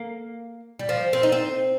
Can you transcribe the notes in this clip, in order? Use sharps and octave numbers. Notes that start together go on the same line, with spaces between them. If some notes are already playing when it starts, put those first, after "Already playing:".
Already playing: A#3
G3
F3
C4
D#4
C4